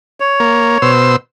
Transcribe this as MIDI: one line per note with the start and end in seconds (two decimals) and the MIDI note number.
0.20 0.91 73
0.40 0.78 58
0.82 1.16 47
0.82 1.16 72
0.82 1.16 88